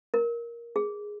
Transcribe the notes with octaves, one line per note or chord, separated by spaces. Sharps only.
A#4
G#4